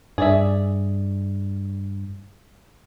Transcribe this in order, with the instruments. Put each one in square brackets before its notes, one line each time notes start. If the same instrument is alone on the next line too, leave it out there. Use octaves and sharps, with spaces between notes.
[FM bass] G2 [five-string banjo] G#4 D5 E5